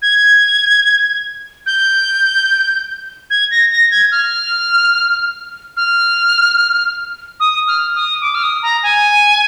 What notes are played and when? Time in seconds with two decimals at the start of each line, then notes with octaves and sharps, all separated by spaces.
0.02 G#6
1.66 G6
3.30 G#6
3.51 A#6
3.72 A#6
3.91 G#6
4.12 F6
5.77 F6
7.40 D#6
7.67 F6
7.95 D#6
8.21 D6
8.35 F6
8.43 D#6
8.63 A#5
8.83 G#5